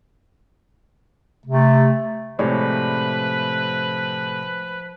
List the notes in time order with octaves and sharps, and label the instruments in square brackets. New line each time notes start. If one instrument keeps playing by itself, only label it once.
[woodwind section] C3 A3
[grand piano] A2 C3 [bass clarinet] F3 [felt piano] G#3 C#5 D5 [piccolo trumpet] B4